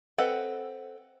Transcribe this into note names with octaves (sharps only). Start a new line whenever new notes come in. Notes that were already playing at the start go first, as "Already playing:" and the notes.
C4 A4 B4 D#5 F#5